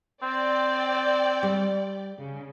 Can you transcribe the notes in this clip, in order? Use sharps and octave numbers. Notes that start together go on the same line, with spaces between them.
C4 D5 G5
G3
C#3